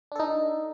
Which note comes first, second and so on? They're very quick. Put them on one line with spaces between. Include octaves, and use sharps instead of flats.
D4 A4 D#4